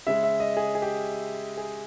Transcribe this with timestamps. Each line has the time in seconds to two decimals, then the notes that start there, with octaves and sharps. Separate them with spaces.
0.07 C#3 G#3 E5
0.23 E5
0.40 D#5
0.57 G#4
0.75 G#4
0.82 G4
1.57 G#4